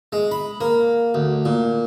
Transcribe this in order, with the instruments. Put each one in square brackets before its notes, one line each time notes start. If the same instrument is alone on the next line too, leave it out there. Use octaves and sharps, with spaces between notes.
[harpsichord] G#3
B5
A#3
D2
A#2